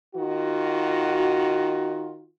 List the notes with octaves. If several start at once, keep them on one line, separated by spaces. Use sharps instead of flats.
D#3 F4 F#4